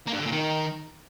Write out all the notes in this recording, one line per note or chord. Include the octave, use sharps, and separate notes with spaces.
A#3
G2
D3
A#2
D#3